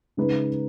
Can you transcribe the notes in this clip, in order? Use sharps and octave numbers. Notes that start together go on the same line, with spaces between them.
C#3 G#3 D#4 G#4 B4